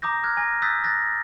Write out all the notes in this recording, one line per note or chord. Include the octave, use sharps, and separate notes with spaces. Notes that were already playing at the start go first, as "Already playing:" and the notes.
A#5 D6 D#6 G6 A#6
F6 F#6 G#6
G#5 A#6
D#6 E6 F#6 G6 A6 B6
D#6 F#6 A6 A#6